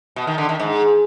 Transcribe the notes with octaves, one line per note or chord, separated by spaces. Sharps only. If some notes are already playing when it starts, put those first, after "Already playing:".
B2
D#3
D3
D#3
G#2